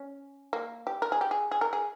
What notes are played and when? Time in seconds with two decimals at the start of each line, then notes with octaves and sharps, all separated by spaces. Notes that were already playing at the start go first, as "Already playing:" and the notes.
Already playing: C#4
0.53 A#3
0.87 G4
1.02 A#4
1.12 G#4
1.21 G4
1.31 G#4
1.51 G#4
1.61 A#4
1.73 G#4